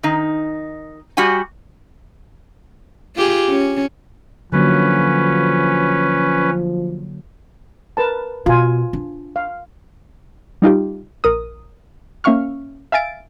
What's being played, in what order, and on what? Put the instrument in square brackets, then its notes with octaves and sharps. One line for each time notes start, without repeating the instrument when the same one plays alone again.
[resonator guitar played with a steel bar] D#3 D#4
G3 F#4 G4 F#5 G#5
[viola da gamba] F4 G4 G#4
C#4
[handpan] D3 F#3 A#3 [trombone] F3 [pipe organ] C#4 B4
[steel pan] A#4 B4 A5
[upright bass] B2 [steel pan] F4 G#5
[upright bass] D4
[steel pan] F5
[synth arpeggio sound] G3 D#4 F4 G4
A#1 A#4 D#6
A#3 C#4 E5 F5 C#6 F6
E5 F5 G#5 A6 D7